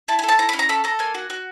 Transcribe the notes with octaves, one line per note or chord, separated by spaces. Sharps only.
E4 A5
G#5
A4
A5
E4 A#5
B5
C#4
A#5
A4 B5
A4 A#5
A#3 G#5
F#4
F#4